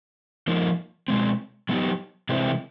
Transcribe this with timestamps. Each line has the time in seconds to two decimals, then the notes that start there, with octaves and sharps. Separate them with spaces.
0.47 F3 A#3 D#4
1.08 B2 G#3 C4
1.69 F#3 B3 D#4 G4
2.29 C3 E3 G#3 C4 E4